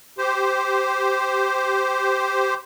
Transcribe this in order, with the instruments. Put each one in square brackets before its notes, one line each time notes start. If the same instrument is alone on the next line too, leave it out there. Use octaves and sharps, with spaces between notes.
[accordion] G4 C5